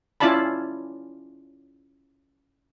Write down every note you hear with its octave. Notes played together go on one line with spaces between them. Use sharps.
C#4 E4 F4 D5 A5 B5